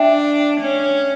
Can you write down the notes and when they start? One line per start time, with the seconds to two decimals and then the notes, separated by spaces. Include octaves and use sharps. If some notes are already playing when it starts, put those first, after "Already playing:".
Already playing: D4 E5 G5
0.61 C#4